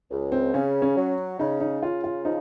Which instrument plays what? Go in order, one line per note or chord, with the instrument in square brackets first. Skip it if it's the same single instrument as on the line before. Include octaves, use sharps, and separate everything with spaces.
[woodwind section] C#2
[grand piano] C4
[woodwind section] C#3 [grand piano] C#4
[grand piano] C#4
[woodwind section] F#3
[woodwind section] C#3 [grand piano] D#4
[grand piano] D#4
[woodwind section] C#3 [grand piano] F4
[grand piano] F4
[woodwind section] F3 [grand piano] D#4